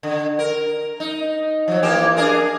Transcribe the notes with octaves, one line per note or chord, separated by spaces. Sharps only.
D3
A#4
D#4
F3 F#3
E3 A#3 G4
D4 G#4 A#4